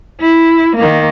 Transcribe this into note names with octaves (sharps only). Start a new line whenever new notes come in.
E4
D#3 A#3